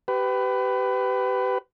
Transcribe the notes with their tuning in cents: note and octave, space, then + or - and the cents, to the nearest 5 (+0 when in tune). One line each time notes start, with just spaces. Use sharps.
G4 -20 B4 +20